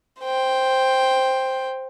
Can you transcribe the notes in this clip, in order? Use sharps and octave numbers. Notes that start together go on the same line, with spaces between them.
C5 G5